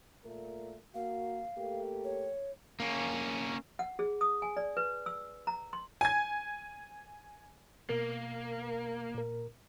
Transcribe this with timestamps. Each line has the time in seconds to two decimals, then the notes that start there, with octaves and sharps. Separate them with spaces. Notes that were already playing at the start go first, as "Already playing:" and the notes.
0.25 A#2 A3 A#4
0.95 A#3 F#4 F5
1.58 A3 A#3 G4
2.04 C#5
2.80 A#3 C#4
3.79 F#5
3.99 G#4
4.21 D#6
4.42 G#5
4.57 D5
4.77 B4
5.06 E6
5.47 A#5
5.73 C6
6.01 G#5 G#6
7.89 B2 A#3 A#4
9.15 A#2 A#4